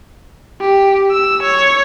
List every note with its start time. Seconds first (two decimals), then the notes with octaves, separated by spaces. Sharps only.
0.60 G4
1.11 E6
1.43 C#5